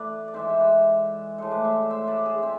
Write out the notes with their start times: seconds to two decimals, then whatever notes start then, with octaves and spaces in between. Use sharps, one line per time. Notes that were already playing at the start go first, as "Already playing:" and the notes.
Already playing: E3 A3 A4 B4 D5
0.28 D5
0.34 G#2 E3 G#3 C5 E5
0.49 E5
0.60 B4 D5
1.38 A2 G#3 A4 C5
1.51 B4 D5
1.64 C5 E5
1.90 C5 E5
2.07 B4 D5
2.26 E4 G#4
2.42 G#3 C4 E4